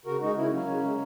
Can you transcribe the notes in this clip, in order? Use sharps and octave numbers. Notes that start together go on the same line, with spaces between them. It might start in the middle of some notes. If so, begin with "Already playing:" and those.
C#3 F#4 A#4
G#3 D#4 F#4
C#3 C#4 E4
F#3 A#3 C#4
C#3
G#3